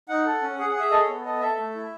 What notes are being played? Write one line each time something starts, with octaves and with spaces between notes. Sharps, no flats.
D#4 F#5
A4
C#4
G#4 F#5
F#5
G#4 E5
A4 D#5
C#5
B3
A4 D#5
A4 E5
A3
E4